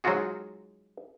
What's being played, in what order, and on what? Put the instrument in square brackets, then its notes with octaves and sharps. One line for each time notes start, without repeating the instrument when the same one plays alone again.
[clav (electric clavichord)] F#3 G#3 D#4 F4 F#4 G#4